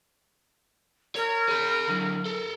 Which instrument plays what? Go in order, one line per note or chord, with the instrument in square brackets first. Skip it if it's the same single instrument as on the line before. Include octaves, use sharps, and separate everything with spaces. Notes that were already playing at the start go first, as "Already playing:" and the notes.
[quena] A#4 [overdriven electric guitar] C#5
[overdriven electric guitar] G#4 B5
D3 F#3
A4 A#4